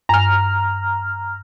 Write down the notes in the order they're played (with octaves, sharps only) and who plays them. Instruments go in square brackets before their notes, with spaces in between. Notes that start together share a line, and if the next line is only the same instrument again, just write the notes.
[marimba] G2 G#5 [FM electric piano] A#5 F6